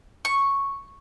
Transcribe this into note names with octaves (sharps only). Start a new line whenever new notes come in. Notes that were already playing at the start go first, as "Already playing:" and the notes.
C#6